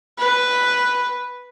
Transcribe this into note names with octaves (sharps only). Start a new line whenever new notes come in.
B4